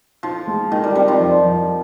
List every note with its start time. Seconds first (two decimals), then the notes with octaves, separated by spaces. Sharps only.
0.23 F3 D#4
0.47 G#3
0.71 D#3 D#4
0.84 G3
0.95 G3 C4
1.08 F3
1.20 F2
1.44 F2